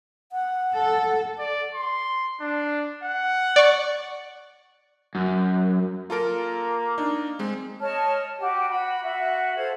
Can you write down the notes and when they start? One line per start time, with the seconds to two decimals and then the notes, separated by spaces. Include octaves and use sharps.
0.32 F#5
0.74 A4
1.39 D5
1.75 C6
2.41 D4
3.03 F#5
3.56 D5 C#6
5.15 F#2
6.10 A#3 F4 A4 A#4
6.98 D4 D#4
7.39 G#3 C4
7.81 C#5 D#5 A5 F6
8.39 F#4 G4
8.70 F#4 B5
9.04 F#4 E5
9.56 A4 C5 F5 G#6